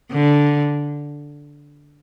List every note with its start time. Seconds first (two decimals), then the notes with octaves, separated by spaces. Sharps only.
0.12 D3